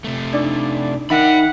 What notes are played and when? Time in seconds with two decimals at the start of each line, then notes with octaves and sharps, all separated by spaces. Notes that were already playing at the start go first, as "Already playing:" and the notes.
0.04 C3 A3
0.33 D4 D#4 D5
1.10 D#3 D#4 E5 F#5 G5 B5 B6